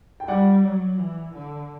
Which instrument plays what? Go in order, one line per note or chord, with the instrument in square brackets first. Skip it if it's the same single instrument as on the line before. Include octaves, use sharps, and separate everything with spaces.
[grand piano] G5
[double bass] G3 [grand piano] D5 F#5
[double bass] F#3
E3
D3